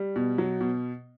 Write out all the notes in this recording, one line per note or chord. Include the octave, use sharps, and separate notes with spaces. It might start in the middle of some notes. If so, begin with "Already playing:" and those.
Already playing: G3
B2
F#3
B2